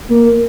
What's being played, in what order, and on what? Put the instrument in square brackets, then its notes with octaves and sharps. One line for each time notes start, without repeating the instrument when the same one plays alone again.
[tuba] A#3